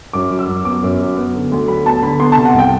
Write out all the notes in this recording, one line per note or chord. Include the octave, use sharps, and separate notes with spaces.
F#2 D6
F#3
E6
F#2
B3 D6
F#2
F#3
B3
D3
D2
F#3 B5
B3 A5
D3 B5
B3 C6
A5
C3
F#5
C2
G5